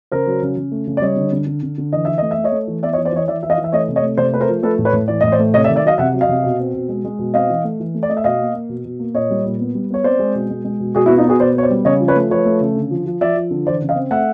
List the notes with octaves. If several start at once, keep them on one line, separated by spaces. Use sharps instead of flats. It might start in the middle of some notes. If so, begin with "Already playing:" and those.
C#3 A#4 C5
F#3
C#3
C#3
A3
C#3
D5
G3 C#5 D#5
D3
D3
D3
D3
D3
E3 D#5
E3 E5
A3 D#5
E5
A3
C#5 D#5
A3
E3
B3 D5 E5
C#5 D#5
E3
C5 D5
E3 C#5 D#5
E3 D5 E5
E3 E5
D#5 F5
E3
E5
A3 C#5 D#5
C3
C#5 D#5
A3
C3 C5 D5
A3 B4
A#4 C5
F3
A3 A4 B4
A2
B4 C#5
A2
E3 D5
A2 D#5
C5 D5
A3
C3 C#5 D#5
D5 E5
D#3
D5 E5
F#3 D#5 F5
C3 E5 F#5
F#3
D#5 F5
C3
B2
C4
B2
G#3
G#3
B2
C4 D#5 F5
E3
A3
E3
A3
D5
A3 D#5
E5
B2 D#5 F5
A#3
A#3
B2
B2
A#3
A#2 C#5 D#5
G3
A#2
B3
G3
B3 C#5
C4 C5 D5
G#3
B2
G#3
G#3
B2
B2 F#4 G#4
E4 F#4
B3
D#4 F4
B3 F#4 G#4
B2 C5 D5
B3 C#5
C5 D5
G3
C#3 C#5 D#5
F3
B4 C#5
A3
F3 B4 C#5
A3
C#3
D3
F3
F3
F3 D5 E5
F3
D3
E3 C5 D5
C#3
D#5 F5
C4
A3 E5 F#5